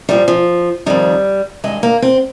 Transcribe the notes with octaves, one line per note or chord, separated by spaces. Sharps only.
A#2 F3 G3
F3
F2 D#3 G3
G2 D#3 G#3
A#3
C4